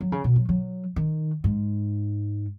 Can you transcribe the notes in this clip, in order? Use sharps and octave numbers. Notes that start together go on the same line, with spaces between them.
F#3
C#3
B2
F#3
F#3
D#3
G#2